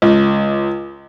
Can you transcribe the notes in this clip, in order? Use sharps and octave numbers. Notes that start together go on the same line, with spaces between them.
C#2